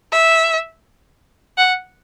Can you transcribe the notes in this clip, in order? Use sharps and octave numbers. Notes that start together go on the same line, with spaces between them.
E5
F#5